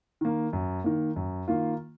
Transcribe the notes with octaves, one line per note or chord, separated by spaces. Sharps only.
D#3 A#3
F#2
D#3 A#3
F#2
D#3 A#3 F4